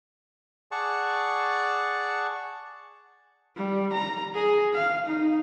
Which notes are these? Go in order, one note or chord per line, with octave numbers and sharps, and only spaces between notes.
G#4 D5 F#5 A5 C#6
G3
A#5
G#4
F5
D#4